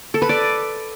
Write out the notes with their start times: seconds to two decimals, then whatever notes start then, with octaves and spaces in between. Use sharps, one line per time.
0.14 A4
0.22 B4
0.29 D5